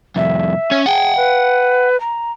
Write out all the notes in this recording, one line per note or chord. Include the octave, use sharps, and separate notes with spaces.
C2 F2 E5
C#4 C#5
G#4 F#5 G5
B4
A#5